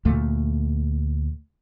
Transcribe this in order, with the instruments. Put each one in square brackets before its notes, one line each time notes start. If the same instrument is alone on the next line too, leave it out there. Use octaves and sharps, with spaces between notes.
[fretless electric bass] D2 A#2 A3